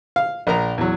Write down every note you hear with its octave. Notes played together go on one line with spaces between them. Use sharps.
F5
A#1 A#4 A#5
E2 F#3